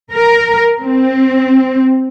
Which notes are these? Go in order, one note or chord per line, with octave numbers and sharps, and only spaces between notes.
A#4
C4